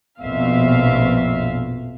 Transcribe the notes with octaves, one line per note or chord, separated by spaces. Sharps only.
A#1 F2 B2 E5 F5